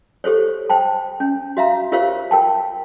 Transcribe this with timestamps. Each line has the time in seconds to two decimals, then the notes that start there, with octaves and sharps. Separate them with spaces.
0.24 G4 A4 C5 C#5
0.70 C5 G5 A5
1.20 C#4
1.57 F#4 E5 F5 A#5
1.92 F4 G4 A#4 C5 C#5 F5
2.31 A#4 G5 A5